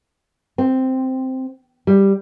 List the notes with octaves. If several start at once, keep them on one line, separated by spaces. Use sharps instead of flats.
C4
G3